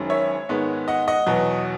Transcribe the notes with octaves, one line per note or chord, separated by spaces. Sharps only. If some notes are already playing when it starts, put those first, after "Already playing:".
Already playing: F#1 F#2 D#3 G#3 C#4
C#5 E5
G#2 D#3 G#3 B3
D#5 F#5
D#5 F#5
E2 B2 F#3